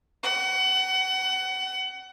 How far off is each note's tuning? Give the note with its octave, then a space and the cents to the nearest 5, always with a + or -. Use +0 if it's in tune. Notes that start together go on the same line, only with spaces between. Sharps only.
F#5 +30